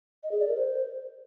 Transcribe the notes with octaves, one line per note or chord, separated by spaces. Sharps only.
D#5
G#4
D5
A#4
C5